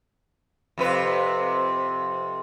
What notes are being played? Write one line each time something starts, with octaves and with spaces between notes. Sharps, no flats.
F2 C3 B4